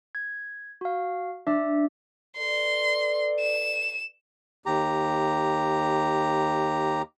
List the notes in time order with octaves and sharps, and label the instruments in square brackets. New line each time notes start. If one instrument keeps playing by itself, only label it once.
[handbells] G#6
F#4 F5
[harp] D4 [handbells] E5
[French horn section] A4 B4 D5 [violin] C6
[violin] E7
[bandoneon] D#2 G4 A#5